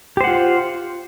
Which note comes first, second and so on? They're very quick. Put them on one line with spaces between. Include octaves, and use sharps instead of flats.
G4 C5 F#5 F4